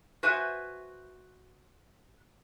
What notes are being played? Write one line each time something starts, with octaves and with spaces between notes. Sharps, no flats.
F#4 B4 C5 E5 G#5